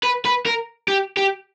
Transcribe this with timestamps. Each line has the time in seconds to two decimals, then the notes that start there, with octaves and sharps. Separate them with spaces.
0.03 B4
0.26 B4
0.46 A#4
0.88 G4
1.17 G4